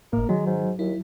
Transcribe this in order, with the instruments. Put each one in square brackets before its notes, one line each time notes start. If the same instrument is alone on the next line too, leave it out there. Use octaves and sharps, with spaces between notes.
[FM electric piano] G1 A2 [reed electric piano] A#3 [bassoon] A#4
[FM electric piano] D#3 [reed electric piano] F#3 [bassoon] G#3
[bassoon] G#2
[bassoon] D#2 [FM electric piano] E4